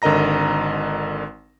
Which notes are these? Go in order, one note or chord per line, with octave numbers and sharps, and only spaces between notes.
G#1 D3 A#4 D#5 A#5 A#6